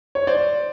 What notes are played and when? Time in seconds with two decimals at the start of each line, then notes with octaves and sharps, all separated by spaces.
0.15 C#5
0.27 C5 D5